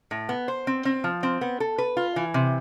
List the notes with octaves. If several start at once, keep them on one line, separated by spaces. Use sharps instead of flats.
A2
B3
C5
C4
C4
F3
C4
B3
A4
B4
F4
E3
C3